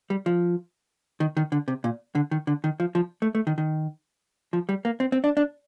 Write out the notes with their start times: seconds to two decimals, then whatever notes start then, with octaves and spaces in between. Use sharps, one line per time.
0.10 G3
0.26 F3
1.20 D#3
1.37 D#3
1.52 D3
1.68 C3
1.84 A#2
2.15 D3
2.31 D#3
2.47 D3
2.64 D#3
2.80 F3
2.95 F3
3.22 A3
3.35 A3
3.47 D#3
3.58 D#3
4.53 F3
4.69 G3
4.85 A#3
5.00 C4
5.12 C4
5.24 D4
5.37 D4